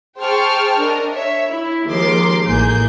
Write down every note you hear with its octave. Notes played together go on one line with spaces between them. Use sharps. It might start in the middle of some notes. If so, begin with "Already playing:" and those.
G#4 C5 G5 A5 C#6 F6
D4 A#4 D#5
C#5 E5
E4
D#2 F3 G#3 A#4 C6 D6
A1 E3 A#3 G#4 G6